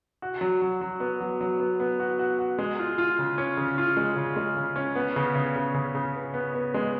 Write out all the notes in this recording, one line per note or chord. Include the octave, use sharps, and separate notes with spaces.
F#4
F#3
F#3
F#3
B3
F#3
F#3
B3
B3
F#4
F#4
F#4
G#3
F4
F4
C#3
C#4
C#3
F4
G#3
C#3
G#3
C#3
C#4
B3
C#3
C#3
C#3
C#3
C#3
B3
B3
B3
G#3